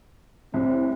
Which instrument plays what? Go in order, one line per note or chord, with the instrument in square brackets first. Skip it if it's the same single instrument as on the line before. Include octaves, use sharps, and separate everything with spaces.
[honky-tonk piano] C2 A2 [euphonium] C4